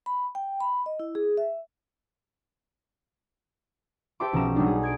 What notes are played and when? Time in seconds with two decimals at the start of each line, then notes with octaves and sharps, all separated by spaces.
0.06 B5
0.35 G5
0.60 B5
0.86 D#5
1.00 E4
1.15 G#4
1.37 E5
4.20 G4 C5 E5 A5 C6 D6
4.33 B1 F3 C#4 A#5 E7
4.55 F#3 G3 D4 D#4
4.67 G#4
4.83 G#6 D7